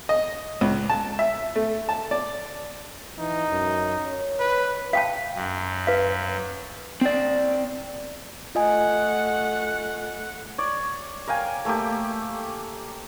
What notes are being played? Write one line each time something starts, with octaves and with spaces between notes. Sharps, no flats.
D#5
C#2
A5
E5
A3
A5
D5
E3 D#4
F#2
C#5
B4
F5 G5 A5
F#2
B4 F5
C4 D5
A3 F4 D#5 F#5 G#5
C#5 D5
A#4 F5 G5 G#5
A3 A#3 G4